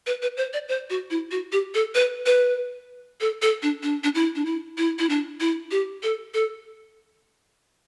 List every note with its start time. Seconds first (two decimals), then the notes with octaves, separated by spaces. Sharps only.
0.07 B4
0.22 B4
0.37 C5
0.53 D5
0.68 C5
0.90 F#4
1.10 E4
1.31 F#4
1.52 G4
1.74 A4
1.95 B4
2.26 B4
3.21 A4
3.42 A4
3.62 D4
3.83 D4
4.04 D4
4.15 E4
4.35 D4
4.45 E4
4.78 E4
4.99 E4
5.09 D4
5.40 E4
5.71 G4
6.03 A4
6.34 A4